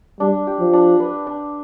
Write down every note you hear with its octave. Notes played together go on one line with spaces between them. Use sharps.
G3 D4
G4
F3
D4
B4
D4